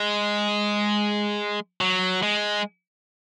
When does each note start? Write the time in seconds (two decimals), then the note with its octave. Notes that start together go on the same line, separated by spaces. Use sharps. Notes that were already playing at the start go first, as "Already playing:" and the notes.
Already playing: G#3
1.81 F#3
2.23 G#3